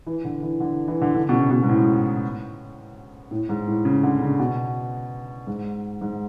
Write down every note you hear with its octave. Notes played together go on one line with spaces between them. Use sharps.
E3
D3
E3
D3
E3
D3
D3
B2
C#3
B2
G#2
A2
A2
G#2
A2
C#3
D3
C#3
B2
G#2
G#2